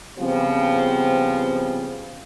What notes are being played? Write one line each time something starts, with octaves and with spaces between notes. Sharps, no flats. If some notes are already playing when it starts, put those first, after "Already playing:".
C#3 F3 G3 B3 C4